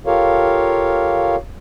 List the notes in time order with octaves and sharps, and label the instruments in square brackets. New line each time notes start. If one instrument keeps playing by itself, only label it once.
[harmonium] F4 G4 A4 A#4 C#5 F5